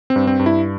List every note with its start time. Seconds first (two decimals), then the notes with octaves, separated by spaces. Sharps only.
0.10 C4
0.16 G2
0.27 C4
0.39 G2
0.46 E4